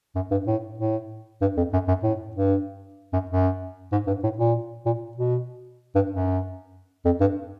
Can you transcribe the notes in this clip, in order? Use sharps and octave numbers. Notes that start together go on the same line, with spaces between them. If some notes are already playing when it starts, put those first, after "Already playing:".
F#2
G2
A2
A2
G2
F2
F#2
F#2
A2
G2
F#2
F#2
G#2
G2
A2
A#2
A#2
B2
G2
F#2
F2
G2